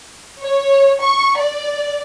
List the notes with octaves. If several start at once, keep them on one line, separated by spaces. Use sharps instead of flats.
C#5
C#6
D5